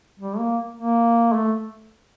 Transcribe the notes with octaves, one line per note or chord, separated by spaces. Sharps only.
G3
A#3
A#3
A3